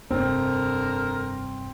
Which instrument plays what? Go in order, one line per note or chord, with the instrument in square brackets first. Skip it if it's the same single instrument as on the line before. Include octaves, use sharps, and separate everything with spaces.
[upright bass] F1 G2 [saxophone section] D3 A#4 [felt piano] C4